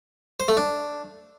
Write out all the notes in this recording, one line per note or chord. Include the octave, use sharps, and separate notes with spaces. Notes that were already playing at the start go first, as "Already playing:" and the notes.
C5
A3
D4